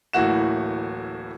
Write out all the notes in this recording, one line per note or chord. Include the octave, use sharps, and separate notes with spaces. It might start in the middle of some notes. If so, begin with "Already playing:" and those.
D1 A2 E3 A#3 F#4 E7